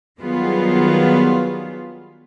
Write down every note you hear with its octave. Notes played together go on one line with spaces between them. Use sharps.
D#3 F#3 G3 B3 F4 G#4